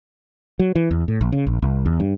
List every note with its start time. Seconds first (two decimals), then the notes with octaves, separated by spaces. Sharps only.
0.59 F#3
0.76 E3
0.91 E2
1.08 A2
1.21 A#1
1.32 C#3
1.47 A#1
1.62 C2
1.86 E2
2.00 G2